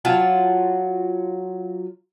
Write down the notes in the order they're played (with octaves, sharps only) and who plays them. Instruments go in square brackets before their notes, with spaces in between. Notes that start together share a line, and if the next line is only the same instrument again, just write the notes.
[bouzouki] F#3 F4 A5